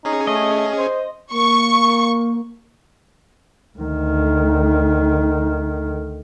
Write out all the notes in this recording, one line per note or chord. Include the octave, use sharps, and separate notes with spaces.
C#4 D#4 G#4
A3 D#5
C5
A#3 C#6
D2 D#3